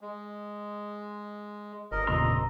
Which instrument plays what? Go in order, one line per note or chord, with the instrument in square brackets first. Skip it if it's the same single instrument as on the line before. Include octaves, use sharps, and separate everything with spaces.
[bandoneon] G#3
[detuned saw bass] G1 [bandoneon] A#4 D#5
[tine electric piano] E2 A#2 C#3 [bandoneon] D#5 [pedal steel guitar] A#5 C6 E6